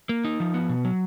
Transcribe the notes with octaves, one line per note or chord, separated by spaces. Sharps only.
A#3
D#4
F3
B3
B2
F#3